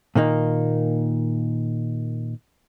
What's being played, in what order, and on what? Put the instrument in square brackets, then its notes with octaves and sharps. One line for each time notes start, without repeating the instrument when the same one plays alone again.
[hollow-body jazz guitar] A#2 D#3 A#3 D#4